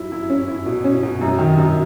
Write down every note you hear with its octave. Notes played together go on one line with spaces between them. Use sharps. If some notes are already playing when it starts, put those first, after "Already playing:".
Already playing: F#3 E4
E4
C#4
E4
B2
C#4
B2
F#2
D#3
F#2